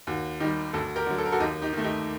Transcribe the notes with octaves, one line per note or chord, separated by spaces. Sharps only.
D#2 F#4
D#3 G3 D#4 G4
D2 F#4 A4
G4 A#4
D3 F#3
A4
A#4
F#4 A4
D#2 D#4 G4
D#4 G4
D#3 A3
D#4 G4